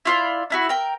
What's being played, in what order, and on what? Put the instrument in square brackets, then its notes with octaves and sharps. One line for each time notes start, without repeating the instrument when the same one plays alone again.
[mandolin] E4 F4 D5
D4 E4 F#4
A#4 G5